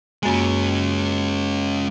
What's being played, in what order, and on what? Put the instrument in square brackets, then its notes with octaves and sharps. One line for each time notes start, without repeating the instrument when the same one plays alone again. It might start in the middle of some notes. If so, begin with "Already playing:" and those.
[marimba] F#2 A#3 G#5 [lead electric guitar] G#3 C#4